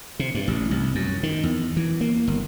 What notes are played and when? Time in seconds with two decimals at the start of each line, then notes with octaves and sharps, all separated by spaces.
0.19 C3
0.35 G2
0.48 A1
0.71 C2
0.95 F#2
1.23 D#3
1.44 E2
1.77 E3
2.01 A#3
2.28 G1